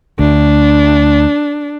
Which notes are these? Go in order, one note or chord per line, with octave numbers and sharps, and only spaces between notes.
D2 D4